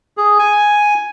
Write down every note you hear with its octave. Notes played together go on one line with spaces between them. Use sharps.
G#4
G#5